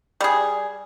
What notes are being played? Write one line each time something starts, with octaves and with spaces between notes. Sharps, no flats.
G3 G#4